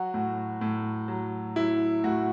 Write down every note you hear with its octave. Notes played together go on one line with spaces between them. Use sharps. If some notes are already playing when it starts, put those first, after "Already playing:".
Already playing: F#3 F#4
A2
A2
F#3
F#3 E4
A2 F#4